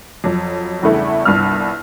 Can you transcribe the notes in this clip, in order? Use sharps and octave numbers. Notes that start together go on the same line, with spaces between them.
F2 F#3
E2 G2 C#3 A3 E4
G1 C2 G2 E6 F6